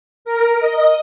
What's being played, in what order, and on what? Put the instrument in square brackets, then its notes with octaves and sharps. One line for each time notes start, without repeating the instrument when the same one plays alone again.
[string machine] A#4
D#5